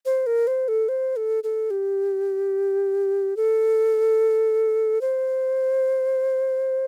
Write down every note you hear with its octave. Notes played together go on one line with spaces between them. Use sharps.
C5
A#4
C5
A4
C5
A4
A4
G4
A4
C5